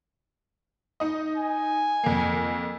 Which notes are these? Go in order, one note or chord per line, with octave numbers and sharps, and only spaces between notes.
D#4 D#5
G#5
F2 A#3